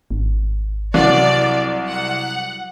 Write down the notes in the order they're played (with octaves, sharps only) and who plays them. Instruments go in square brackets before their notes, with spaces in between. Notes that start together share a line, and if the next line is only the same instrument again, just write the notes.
[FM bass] G#1
[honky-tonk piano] C2 [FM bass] F#3 [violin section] D5
[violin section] F#5